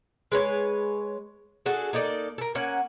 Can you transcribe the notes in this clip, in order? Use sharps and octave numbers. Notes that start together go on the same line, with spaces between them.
G#3 B4 C#5
D4 F#4 G#4 A4
A#3 D#4 A4 D5
A4 A#4
A#3 C#4 F#5